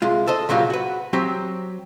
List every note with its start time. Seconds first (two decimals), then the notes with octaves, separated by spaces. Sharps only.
0.02 C2 G#3 F4
0.27 A4 C5 D#5
0.49 A#2 C#3 F#3 A#3 F4 G4
0.70 F#4 B4
1.13 F#3 C4 G4